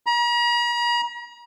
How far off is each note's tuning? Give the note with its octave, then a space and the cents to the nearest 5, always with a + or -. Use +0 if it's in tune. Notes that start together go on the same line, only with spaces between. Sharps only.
A#5 +40